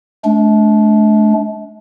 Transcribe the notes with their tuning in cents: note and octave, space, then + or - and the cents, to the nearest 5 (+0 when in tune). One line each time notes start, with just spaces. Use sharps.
A3 -45 D4 -25